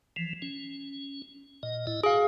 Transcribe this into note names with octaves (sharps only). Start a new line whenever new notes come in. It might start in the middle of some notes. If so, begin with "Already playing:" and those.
E3 F3
C#4
A#2 D#5
A2 E4 D#5
F#4 G#4 F5 G#5